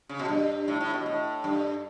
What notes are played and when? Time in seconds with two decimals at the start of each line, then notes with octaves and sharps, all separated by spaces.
0.09 C#3
0.20 B2
0.28 G2
0.68 A2
0.81 A2
0.93 B2
1.06 A2
1.44 G2